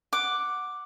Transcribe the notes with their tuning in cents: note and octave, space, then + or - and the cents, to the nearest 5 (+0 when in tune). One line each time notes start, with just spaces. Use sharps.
F#5 +0 D6 +0